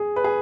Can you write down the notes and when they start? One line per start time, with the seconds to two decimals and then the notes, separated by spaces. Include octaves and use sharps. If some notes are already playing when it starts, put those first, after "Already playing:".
Already playing: G#4
0.16 B4
0.24 G#4